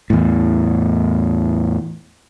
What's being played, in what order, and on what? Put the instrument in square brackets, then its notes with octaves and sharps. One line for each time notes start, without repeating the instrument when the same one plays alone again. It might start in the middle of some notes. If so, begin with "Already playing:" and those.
[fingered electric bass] E2 A2